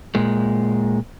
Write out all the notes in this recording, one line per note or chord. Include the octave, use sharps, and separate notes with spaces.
A#2 G#3